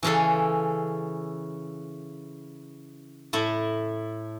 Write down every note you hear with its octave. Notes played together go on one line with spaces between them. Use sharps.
C#3 E3 C#4 A4
A2 A3 E4